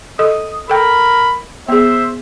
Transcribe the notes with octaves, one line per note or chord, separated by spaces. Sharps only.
A4 D#5 D#6
A4 A#4 G5 B5
B3 G#4 C5 E5